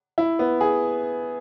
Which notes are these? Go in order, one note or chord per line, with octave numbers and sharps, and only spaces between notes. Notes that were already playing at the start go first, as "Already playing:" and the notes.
E4
B3
G#4